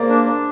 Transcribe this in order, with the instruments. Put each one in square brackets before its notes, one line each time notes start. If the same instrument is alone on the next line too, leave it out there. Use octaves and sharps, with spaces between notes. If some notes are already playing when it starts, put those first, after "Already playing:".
Already playing: [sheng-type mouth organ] A#3 [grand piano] G#4 A#4 C5 D5
[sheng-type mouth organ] D4
D4